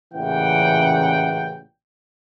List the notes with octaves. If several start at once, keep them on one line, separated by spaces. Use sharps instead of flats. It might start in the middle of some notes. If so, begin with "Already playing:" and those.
A1 A#2 C#3 E3 F#5 G5